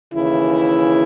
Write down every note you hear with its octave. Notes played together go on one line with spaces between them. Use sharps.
D#2 C#3 E3 E4